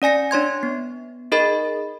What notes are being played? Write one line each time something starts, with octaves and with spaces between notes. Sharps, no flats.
C#4 D5 G#5 A#6 C#7
D4 C#5 C6 G#6
B3
D#4 G#4 A#4 D#5 B5 A6